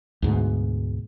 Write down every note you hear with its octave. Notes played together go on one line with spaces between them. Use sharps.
D2 G#2 B2